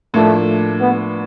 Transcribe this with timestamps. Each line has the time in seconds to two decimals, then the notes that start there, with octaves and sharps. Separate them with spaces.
0.14 A2 F3 A3 A#3 D4
0.81 B3